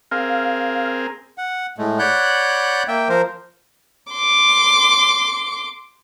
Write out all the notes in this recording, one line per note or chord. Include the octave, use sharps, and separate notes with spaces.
C4 G#4 A#4 F5
F#5
A2 G#3 A3
C#5 D5 F#5 B5 F#6 G6
A#3 E5 G5
F3 A#4 C5
C6 D6